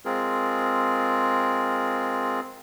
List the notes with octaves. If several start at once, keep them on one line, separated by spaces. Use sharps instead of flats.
G#3 C4 F4 G#4 A#4